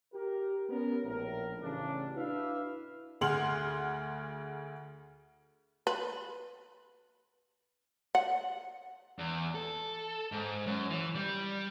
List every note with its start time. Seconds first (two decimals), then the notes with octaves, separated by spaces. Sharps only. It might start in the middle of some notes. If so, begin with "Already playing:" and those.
0.14 G4 A#4
0.69 B3 C#4 A#4
1.05 A#1 A2 A#4
1.61 A1 C#3 D4
2.15 D4 E4 F#4 B4 E5 F5
3.21 D2 G#4 F#5 C6 F6 F#7
5.87 B4
8.15 F#5
9.19 E2
9.55 A4
10.32 G#2
10.66 F#2
10.90 E3
11.16 G3